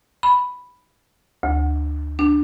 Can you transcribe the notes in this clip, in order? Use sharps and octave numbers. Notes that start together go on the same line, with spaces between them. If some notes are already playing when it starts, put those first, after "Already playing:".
B5
D2
D4